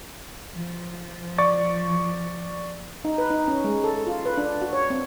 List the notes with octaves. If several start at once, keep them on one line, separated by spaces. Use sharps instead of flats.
F3
D5 C#6 A6
D#4
B4
D#4
C#4
G#3
A4
F4
B4
D4
F#4
C#5
C4